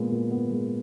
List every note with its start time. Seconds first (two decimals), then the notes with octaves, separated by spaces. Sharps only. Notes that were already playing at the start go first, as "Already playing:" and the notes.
Already playing: A#2 G#3 B3
0.12 A#2
0.31 B3
0.51 G#3